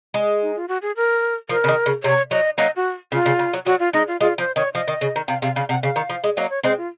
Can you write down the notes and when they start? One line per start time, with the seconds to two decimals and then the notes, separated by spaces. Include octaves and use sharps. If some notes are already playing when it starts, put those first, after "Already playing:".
0.14 G#3
0.42 D#4
0.56 F4
0.68 F#4
0.82 G#4
0.96 A#4
1.49 F3 A#4
1.64 C#3
1.68 D#3
1.86 C#3
2.03 C3 C#5
2.31 F#3 D#5
2.58 F#3 A#3 D#5
2.76 F#4
3.12 C#3 F4
3.26 C#3
3.39 C#3
3.53 F#3
3.66 F#3 F#4
3.80 F4
3.93 G#3 D#4
4.08 F4
4.21 G#3 F4
4.38 F3 C5
4.56 D#3 C#5
4.74 F3 D#5
4.88 D#3
5.01 C#3
5.16 D#3
5.28 C3 F5
5.42 C3 F5
5.55 C#3 F5
5.69 C3 F#5
5.83 C#3 F5
5.96 D#3
6.09 F3
6.24 G#3
6.37 F#3 A#3 D#5
6.50 C#5
6.63 G#3 C4 C5
6.78 F4